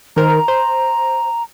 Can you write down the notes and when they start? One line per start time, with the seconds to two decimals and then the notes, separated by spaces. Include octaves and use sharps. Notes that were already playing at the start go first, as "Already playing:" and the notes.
0.16 D#3 A#4 C5 A#5
0.48 C5